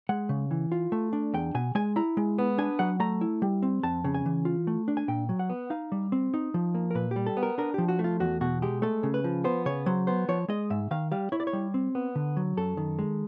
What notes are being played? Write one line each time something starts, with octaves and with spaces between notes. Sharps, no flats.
G#3 F#5
C#3
E3
F4
A3
D4
E2 G5
B2 G#5
G#3 G#5
E4 A#5
G#3
B3
D4 G#5
F#3 F#5
A3 A#5
E4
G3
C4
F2 A5
C#3
G#5
E3
F4
A3
D4
G#5
A#2 G5
F#3
F#5
B3
D#4 F5
G3
C4
D#4
F3
A#3
A#4
A#2 B4
G3 G4
A4
B3
A#4
D4 A#4
F3 G4
F#4
A3
F4
E2 F#4
B2 F#4
G#3 G4
A3 A4
C#3
B4
F3
B3 C5
C#3 C#5
F#3 C5
B3 C5
F3 C#5
G#3 D#5
G#2 E5
D#3 F5
G3 F5
E4 C#5
D5
C#5
G3
C4
B3
D3
F#3
F#2 A4
D#3
G#3